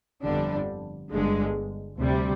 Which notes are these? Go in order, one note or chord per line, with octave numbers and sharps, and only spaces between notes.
G1 F2 D3 G3 D4
G1 G2 D3 G#3
D2 C3 G3